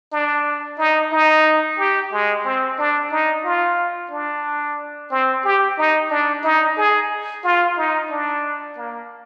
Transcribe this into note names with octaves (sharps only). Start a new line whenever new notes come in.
D4
D#4
D#4
G4
G#3
C4
D4
D#4
F4
D4
C4
G4
D#4
D4
D#4
G#4
F4
D#4
D4
A#3